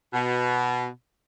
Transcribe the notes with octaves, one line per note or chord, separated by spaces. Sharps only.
B2